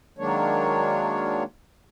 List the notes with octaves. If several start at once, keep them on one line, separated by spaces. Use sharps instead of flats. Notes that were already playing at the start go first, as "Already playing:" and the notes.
D#3 F#3 G#3 A#3 D4 C#5